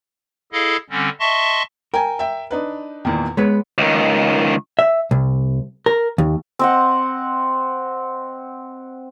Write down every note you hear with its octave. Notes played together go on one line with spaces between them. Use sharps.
E4 G#4 A4 D#5 F5
D3 G3 C4 C#4
D#5 E5 A5 C6 C#6
A#4 G5 G#5
E5 G5
D4 D#4 B4
E2 A#2 D#3
G#3 B3 B4 C#5
C#2 D#3
E5
C2
A#4
D#2
C4 D#5 F#5